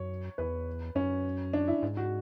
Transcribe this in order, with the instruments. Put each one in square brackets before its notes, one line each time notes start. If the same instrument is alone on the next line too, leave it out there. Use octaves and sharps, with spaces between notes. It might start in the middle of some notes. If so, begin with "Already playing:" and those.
Already playing: [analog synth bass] F#2 [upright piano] C#5
[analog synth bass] E2 [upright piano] B4
[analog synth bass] F#2 [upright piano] C#4
[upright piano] D4
E4
[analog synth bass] G#2
[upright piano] F#4